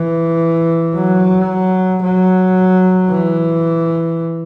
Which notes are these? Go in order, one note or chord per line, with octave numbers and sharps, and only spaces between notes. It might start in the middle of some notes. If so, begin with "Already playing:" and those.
Already playing: E3
F#3
F#3
E3